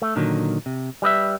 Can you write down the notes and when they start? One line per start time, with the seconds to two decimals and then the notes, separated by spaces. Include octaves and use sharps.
0.02 A3
0.16 A#2 D3 D#3 F#3
0.66 C3
1.02 G3 B4 D#5 E5